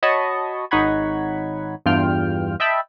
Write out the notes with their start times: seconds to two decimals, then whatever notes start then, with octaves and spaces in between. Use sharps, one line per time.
0.03 F#4 C#5 D#5 A5 B5 C#6
0.71 G#1 D#4 C#5 F#5 B5 G#6
1.86 E2 G2 F4 G5 F6
2.60 D#5 E5 G5 A5 B5 E6